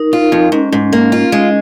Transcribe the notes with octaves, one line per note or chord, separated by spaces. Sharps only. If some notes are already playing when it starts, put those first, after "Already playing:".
Already playing: D#4 A#4
D#4 F4
F2 D#4
G#2 C#4
G#2
A#3
F4
G#3